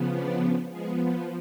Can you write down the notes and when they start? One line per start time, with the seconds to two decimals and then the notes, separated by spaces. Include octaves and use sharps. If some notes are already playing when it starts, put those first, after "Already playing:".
Already playing: C#3 F3 B3
0.15 D4 D5
0.69 F3 G#3 B3 G#4